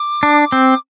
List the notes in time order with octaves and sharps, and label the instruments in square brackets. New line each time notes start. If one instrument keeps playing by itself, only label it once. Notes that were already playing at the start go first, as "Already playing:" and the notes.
Already playing: [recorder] D6
[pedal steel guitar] D4
C4